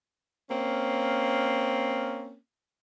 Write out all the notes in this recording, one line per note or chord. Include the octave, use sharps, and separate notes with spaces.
A#3 C4 C#4